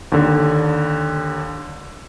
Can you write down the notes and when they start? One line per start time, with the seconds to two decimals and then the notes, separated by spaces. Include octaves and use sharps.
0.12 D#2 D3